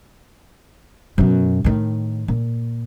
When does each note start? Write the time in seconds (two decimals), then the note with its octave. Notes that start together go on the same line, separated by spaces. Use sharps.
1.18 F#2 B2
1.64 A2 D#3
2.28 A#2